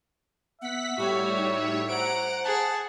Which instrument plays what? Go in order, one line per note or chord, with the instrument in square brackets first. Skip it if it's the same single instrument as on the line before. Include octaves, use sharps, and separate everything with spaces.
[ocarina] B3 [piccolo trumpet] E5 [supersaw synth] F#5 B6
[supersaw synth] A2 G3 C#5 [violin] F#4 [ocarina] G4
[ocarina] D#4
[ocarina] C5 [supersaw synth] F#5 [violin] A#5 D7
[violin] G#4 [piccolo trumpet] A5